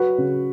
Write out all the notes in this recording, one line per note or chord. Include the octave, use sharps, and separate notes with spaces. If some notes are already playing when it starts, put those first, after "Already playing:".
Already playing: F#3 F#4 B4
C#3